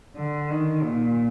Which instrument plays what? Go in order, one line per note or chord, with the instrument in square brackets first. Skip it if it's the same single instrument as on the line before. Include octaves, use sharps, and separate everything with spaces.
[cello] D3
D#3
A#2